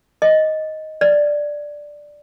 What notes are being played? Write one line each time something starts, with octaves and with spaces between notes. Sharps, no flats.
D#5
D5